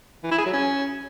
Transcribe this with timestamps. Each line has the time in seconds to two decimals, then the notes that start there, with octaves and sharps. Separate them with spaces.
0.24 E3
0.31 E4
0.39 G#4
0.46 F#3
0.53 C#4